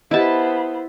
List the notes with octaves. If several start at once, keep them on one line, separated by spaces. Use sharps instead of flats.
B3 E4 G4 C5 D#5 A5